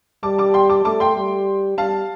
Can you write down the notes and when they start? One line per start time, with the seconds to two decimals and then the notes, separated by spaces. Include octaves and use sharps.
0.23 G3 A5 D6
0.38 A5 D6
0.54 G5 C6
0.70 A5 D6
0.85 A3 A5 D6
1.00 G5 C6
1.17 G3
1.78 G3 F5 A5